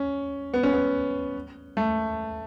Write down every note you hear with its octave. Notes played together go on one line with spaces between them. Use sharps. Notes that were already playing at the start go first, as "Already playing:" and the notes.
Already playing: C#4
B3
C#4
B3
A3